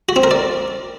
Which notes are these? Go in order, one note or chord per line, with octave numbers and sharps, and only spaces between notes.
F#4
C4
A#4
D5